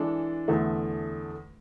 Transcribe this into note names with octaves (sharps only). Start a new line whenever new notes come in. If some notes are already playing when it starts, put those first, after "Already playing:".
Already playing: E3 G#3 D4 A4
E2 D3 A3